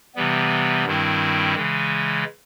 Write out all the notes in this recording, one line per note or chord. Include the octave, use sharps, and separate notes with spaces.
C3 E3 G3 B3
G2 D#3 G3 C4 E4
C#3 E3 G#3